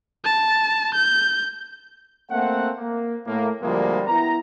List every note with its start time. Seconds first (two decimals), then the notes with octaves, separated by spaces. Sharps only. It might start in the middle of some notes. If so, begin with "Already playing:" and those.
0.24 A5
0.94 G6
2.31 A3 A#3 C4 F#5
2.78 A#3
3.26 A2 A3 A#3
3.61 D2 F3 G3 G#3 A#3
4.07 B3 E4 A#5